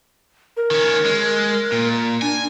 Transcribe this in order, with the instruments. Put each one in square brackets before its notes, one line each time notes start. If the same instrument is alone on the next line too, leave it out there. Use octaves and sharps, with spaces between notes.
[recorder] A#4
[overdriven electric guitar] D#3 C#4
G#3
A#2
[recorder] D4 [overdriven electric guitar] G#5